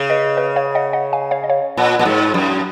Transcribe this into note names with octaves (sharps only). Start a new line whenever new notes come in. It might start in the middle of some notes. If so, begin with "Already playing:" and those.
Already playing: C#3
B4 D#5
B4 D#5
C#5 F5
D#5 F#5
D#5 F#5
F5 G#5
C#5 F5
D#5
C#5 F5
A#2
A#2
G#2
F#2